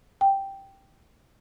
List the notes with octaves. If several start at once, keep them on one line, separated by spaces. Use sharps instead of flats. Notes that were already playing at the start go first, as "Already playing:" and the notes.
G5